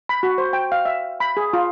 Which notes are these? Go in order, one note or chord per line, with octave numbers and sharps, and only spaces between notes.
B5
F#4
C5
G5
F5
E5
B5
G#4
F4